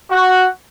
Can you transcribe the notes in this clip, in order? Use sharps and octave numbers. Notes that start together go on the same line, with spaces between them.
F#4